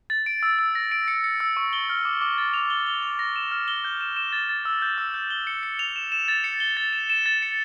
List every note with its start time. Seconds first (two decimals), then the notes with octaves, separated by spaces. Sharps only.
0.10 A6
0.26 D7
0.43 E6
0.59 E6
0.75 A#6
0.92 D7
1.08 C#7
1.24 C#7
1.40 E6
1.57 C#6
1.73 G7
1.90 F6
2.05 D6
2.21 D6
2.38 A6
2.54 F7
2.70 G7
2.86 G7
3.03 F7
3.19 A#6
3.36 E7
3.51 F6
3.68 G7
3.84 G6
4.01 E7
4.17 E7
4.32 A6
4.49 A6
4.65 E6
4.82 G6
4.98 E6
5.14 G6
5.31 G7
5.47 C#7
5.63 C#7
5.79 F7
5.96 E7
6.12 E7
6.28 A6
6.44 C#7
6.60 G7
6.77 A6
6.93 E7
7.10 E7
7.26 A6
7.42 C#7